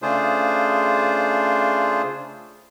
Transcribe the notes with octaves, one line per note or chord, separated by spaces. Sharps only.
C#3 A3 D4 F4 G#4 C5